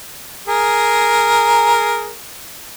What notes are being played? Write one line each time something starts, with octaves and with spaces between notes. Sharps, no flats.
G#4 A#4